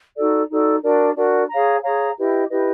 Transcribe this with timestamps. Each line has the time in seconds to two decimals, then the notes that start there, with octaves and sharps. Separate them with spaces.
0.16 D#4 F#4 A4 D5
0.49 D#4 F#4 A4 D5
0.83 D4 F#4 A#4 D5
1.16 D4 F#4 A#4 D5
1.49 G#4 C#5 F5 A#5
1.83 G#4 C#5 F5 A#5
2.17 E4 G4 B4 D#5
2.49 E4 G4 B4 D#5